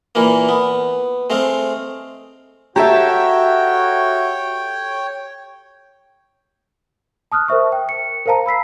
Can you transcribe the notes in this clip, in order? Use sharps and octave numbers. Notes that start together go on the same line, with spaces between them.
A#2 E3 A#3
B3
G#3 A3 C4 F5
F#4 G4 A4 C#5 E5 G5 A5 A#5
A5 D#6 F6 F#6
A#4 C5 E5 C#6
G5
C#7
A#4 C5 F5 A5 A#5
B5 E6 B6 C7